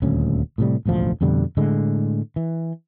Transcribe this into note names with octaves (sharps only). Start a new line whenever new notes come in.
D#1 D2 C#4
A2 C3 G3
E1 A1 D2 F3
F2 B2 D3 G3
A2 D3 G#3
E3